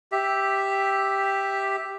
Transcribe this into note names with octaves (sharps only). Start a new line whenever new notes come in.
G4 E5